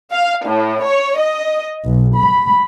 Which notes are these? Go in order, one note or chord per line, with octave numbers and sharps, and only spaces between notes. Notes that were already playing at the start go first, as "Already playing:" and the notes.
F5
A2
C#5
D#5
B1
B5